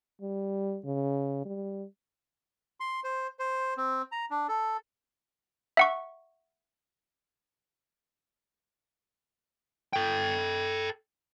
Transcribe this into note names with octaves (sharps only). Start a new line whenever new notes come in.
G3
C#3
G3
C6
C5
C5
C4
A#5
D4
A4
E5 F#5 C#6
A4 G5